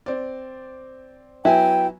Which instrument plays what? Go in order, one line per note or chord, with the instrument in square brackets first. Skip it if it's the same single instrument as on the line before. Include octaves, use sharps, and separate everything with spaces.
[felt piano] C4 D5
[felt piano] F#3 B3 G#5 [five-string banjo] E4 [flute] G5